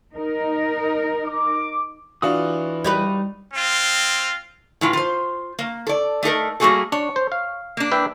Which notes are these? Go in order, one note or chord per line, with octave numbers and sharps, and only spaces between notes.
D#4 A#4
D6
E3 D4 F4 F#4 D#6
G3 D#4 B4
C4 F4
A2 E3 F4
F4 C5
A#3
A4 D5
A3 D#4 A4 A#4
G3 A3 A#3 F#4 G#4 A4
D4 C#5
C5
F5
A#3 D4
B4 E5 G5